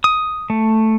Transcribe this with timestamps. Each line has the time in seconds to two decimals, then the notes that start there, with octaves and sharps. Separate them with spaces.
0.04 D#6
0.50 A3